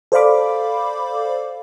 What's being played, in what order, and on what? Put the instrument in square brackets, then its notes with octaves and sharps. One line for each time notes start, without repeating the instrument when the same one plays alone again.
[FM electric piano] A4 C5 D5 F5 B5 D6